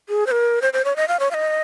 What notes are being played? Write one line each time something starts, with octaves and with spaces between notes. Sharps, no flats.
G#4
C5
A#4
C5
C5
C#5
D#5
F5
C#5
F5
D#5